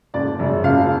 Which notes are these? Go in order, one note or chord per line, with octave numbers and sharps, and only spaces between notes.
F#1 D5
F#2 C#3
F#1 F5